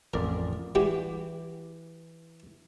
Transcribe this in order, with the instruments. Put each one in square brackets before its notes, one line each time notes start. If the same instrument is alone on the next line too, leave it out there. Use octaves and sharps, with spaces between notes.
[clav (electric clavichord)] A1 F2 D5 [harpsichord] A#4
[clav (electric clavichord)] E3 [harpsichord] G3 F#4 G4